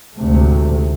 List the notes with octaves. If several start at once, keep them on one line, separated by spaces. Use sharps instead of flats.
D2 G#2 C3 A3